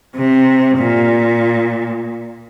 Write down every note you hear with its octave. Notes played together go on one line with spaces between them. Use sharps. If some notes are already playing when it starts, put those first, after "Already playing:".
C3
A#2